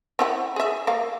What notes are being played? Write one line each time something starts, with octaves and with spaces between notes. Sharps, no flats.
C4 E4 F#5
G#4 E5
A#3 F5